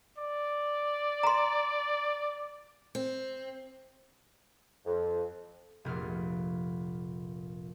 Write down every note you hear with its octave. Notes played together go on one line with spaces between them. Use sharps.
D5
A#5 C6
C4
F2
F1 A#1 F6